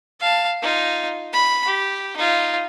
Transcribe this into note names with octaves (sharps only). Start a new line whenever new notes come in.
F5 A5
D#4 F4
B5
G4
D#4 F4